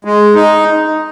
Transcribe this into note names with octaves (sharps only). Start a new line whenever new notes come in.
G#3
D#4